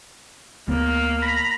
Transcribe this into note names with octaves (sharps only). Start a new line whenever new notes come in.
D2 A#3 B3
A#5 B5